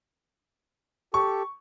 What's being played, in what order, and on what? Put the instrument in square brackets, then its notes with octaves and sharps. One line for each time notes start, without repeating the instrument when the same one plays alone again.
[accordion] G4 A4 [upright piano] C#6